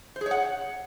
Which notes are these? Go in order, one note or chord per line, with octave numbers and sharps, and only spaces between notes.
C5
G#4
C#5
F#5